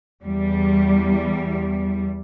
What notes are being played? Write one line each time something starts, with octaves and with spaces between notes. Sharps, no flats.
E2 G3